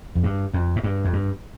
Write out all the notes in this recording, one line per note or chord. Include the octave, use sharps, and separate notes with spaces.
F2
G2
F2
G#2
G2
F2
G2